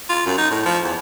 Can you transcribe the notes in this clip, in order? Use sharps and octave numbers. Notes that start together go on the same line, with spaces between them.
F4
F#2
D#4
A2
F3
E2